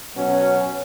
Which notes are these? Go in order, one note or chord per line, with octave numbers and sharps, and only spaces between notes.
B2 F#3 C#4 F#4